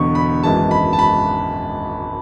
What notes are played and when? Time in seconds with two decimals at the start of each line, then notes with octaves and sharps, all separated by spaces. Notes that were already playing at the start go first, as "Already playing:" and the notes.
Already playing: E1 E2 D3 C#6
0.15 B5
0.43 G#1 F#2 E3 G#3 A5
0.71 B5
0.93 A5
0.99 B5